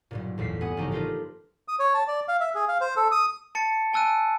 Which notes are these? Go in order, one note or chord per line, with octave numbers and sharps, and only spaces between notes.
B1 G2 A#2
A1 E2 A#2 B6 C7
G2 B3 F#5 G#5 D#6
A1 C#3 F3 D#4 G4 A#5
D4 D#4 F4 G4 A#4 B4
D#6
C#5
A5
D5
F5
E5
G#4
F5
C5
A4
D#6
A5 A6 C#7
G#5 A5 E6 F#6 D#7